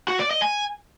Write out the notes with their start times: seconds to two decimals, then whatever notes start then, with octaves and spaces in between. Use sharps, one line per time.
0.08 F#4
0.19 D5
0.31 D#5
0.42 G#5